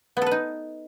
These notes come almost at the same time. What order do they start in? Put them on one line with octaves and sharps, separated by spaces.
B3 A4 B4 D#4